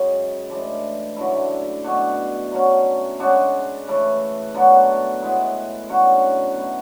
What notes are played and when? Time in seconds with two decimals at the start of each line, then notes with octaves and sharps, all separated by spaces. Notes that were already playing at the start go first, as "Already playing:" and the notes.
Already playing: F#2 C#3 G#3
0.49 A2 E3 G#3 D4
1.16 F#2 D3 A3 E4
1.84 B2 A3 D4 F#4
2.51 D3 F#3 A3 C#4
3.20 C#3 G#3 D4 F#4
3.87 C#3 E3 A3
4.54 D3 F#3 B3 F#4
5.22 A2 G#3 B3 E4
5.89 D3 F#3 C#4 F#4
6.57 B2 A3 E4